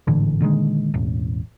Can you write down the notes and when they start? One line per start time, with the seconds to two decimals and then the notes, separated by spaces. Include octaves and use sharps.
0.07 G#1 A2 D3 E3
0.40 A#2 D3 D#3 G#3
0.94 E1 A1